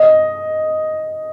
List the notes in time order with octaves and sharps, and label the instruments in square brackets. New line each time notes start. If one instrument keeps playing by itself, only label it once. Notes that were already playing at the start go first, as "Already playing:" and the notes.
Already playing: [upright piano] D#5